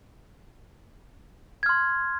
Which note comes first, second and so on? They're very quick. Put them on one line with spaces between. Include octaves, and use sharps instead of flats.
G#6 F6 C6